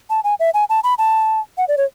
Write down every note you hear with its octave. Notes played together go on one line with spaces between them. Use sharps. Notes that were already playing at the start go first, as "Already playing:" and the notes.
A5
G#5
E5
G#5
A5
B5
A5
F#5
D5
C#5